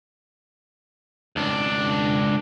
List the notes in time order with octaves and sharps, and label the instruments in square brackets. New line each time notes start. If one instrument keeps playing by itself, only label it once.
[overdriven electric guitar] C#2 D4